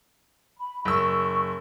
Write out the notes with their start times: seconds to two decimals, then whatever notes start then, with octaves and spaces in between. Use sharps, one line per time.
0.59 B5
0.85 F#1 C#6 E6